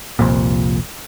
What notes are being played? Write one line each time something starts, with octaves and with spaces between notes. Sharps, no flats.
F1 C2 F2 A#2